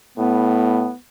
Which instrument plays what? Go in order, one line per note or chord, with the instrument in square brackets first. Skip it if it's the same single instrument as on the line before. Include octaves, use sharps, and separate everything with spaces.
[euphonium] A2 [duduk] B3